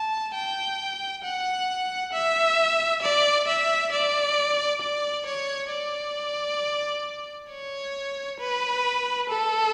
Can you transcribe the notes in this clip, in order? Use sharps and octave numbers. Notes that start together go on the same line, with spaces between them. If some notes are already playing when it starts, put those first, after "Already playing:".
Already playing: A5
G5
F#5
E5
D5
E5
D5
D5
C#5
D5
C#5
B4
A4